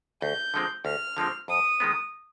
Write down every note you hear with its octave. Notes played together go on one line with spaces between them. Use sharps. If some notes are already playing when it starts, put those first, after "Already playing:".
D2 G6
D3 F3 G#3 C4
D2 F6
D3 F3 G#3 C4
F2 D#6
D#3 G#3 B3